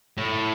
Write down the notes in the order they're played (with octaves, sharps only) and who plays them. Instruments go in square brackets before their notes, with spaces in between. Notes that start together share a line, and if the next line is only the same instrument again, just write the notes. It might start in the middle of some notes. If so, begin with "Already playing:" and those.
[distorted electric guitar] A2